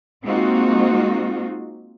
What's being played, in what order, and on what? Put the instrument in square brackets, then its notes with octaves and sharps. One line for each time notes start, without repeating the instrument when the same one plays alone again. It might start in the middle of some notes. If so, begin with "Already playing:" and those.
[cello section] G#3 A#3 C4 D#4 F4 F#4